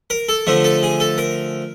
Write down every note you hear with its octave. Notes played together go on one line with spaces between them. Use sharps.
A#4
A4
D3 F3 A3
A4
G#4
A4
A#4